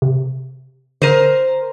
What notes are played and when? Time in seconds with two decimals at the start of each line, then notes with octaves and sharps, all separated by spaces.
0.02 C3
1.02 D3 A#4 C5 D#7